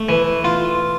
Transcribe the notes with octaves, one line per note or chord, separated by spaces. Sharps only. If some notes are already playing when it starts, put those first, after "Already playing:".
Already playing: A3
E3
F4